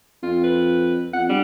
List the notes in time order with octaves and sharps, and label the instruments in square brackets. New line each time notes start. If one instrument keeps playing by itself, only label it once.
[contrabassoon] F2 [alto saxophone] F4
[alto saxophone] B4
[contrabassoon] F2 [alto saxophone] F#5
[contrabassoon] G2 [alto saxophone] G3